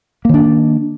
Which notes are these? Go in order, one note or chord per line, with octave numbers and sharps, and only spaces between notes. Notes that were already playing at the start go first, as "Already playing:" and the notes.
D#3 A#3 D4